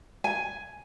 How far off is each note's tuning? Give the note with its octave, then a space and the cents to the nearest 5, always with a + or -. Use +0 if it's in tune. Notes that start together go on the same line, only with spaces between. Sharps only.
G#5 +5